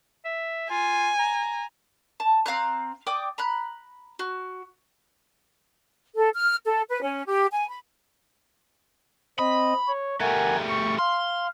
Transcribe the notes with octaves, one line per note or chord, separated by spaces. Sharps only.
E5
F4 G#5
A#5
A5
C4 F5 A#5 F#6
D5 G5 D6 D#6
A#5 B5 F#6
F#4
A4
F6
A4
B4
C#4
G4
G#5
B5
C4 D#5 B5
C#5
G3 A3 A#4 F#5 G#5
C#6
F5 C6